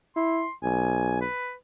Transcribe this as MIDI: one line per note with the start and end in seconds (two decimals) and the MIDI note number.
0.16 0.45 64
0.16 0.52 84
0.63 1.24 35
0.63 1.21 80
1.21 1.53 71